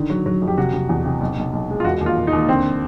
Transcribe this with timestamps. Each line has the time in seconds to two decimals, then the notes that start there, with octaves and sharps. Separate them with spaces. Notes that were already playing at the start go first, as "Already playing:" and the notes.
Already playing: D3 D#3
0.10 F#3
0.26 F#3
0.42 F2
0.48 G4
0.58 C3 F#4
0.73 C3
0.89 E2
1.06 C3
1.21 B1
1.37 B1
1.53 B1
1.69 G#3
1.80 F4
1.84 E1 F#4
2.01 D#2
2.06 F4
2.17 E1
2.27 D#4
2.33 D#2
2.48 D3 C4